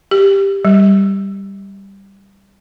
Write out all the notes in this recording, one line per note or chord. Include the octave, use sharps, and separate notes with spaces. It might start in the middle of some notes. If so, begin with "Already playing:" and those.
G4
G3